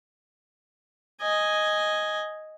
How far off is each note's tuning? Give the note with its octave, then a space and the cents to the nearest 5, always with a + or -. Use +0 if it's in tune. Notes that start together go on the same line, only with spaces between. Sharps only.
D#5 +0 G#5 +0